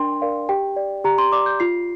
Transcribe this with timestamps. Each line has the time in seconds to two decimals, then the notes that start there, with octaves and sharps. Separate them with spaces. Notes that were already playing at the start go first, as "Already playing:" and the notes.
Already playing: D4 A#4 D5 G5 C6
0.21 A#4 D5 F5
0.49 G4 G5
0.76 D5
1.04 G4 A#5
1.18 C6
1.32 D5 D6
1.46 G6
1.60 F4 C7